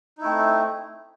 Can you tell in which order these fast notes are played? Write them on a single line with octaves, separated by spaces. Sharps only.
D#4 E4 A3 C4